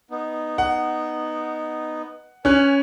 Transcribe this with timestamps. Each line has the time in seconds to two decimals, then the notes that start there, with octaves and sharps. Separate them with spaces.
0.11 B3 D#4
0.58 F#5
2.45 C#4 B4 G#5 F6 F#6